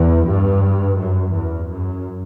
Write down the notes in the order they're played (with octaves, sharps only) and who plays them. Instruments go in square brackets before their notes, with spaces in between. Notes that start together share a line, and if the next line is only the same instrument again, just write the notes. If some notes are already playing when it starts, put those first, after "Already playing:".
Already playing: [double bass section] E2
G2
F#2
E2
F#2